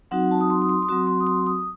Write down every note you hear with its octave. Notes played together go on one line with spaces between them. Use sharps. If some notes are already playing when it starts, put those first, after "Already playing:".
F#3 C4 D#4 F#4 F#5
A5
D#6
C6
D#6
C6
D#6
F#3 C4 F#4 C6
C6
D#6
C6
D#6